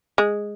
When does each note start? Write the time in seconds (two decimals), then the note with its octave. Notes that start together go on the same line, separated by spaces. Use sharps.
0.18 G#3